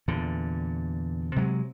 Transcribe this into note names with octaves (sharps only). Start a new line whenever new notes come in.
E2 A#2 D3
C3 F#3 G#3